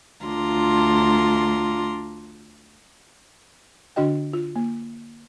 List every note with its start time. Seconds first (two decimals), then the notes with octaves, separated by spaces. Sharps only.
0.24 D2 D4 F4 A#5 C6
3.96 D3 D4 F#4 D#5 G5
4.33 F4
4.56 A#3